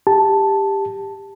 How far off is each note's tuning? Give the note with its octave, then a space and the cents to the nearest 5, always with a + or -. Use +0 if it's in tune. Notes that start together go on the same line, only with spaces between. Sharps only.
G4 +10 A5 +0